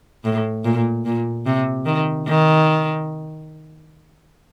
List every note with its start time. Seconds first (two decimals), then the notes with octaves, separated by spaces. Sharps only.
0.24 A2
0.65 A#2
1.05 A#2
1.46 C3
1.86 D#3
2.27 D#3